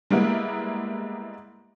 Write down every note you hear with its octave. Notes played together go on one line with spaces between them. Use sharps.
G3 G#3 A#3 B3 E4